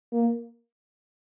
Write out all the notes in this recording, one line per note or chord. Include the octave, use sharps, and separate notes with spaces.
A#3